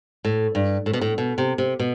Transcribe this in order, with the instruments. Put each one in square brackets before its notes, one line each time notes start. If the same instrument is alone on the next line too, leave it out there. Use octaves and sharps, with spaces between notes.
[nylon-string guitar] A2
G2
A2
B2
A2
B2
C3
C3
B2